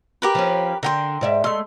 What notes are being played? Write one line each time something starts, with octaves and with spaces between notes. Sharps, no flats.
G4 A#4 B4
F3 C#4
D3 A#4 G5 C6
G#2 D5 E5
G#3 A3 C6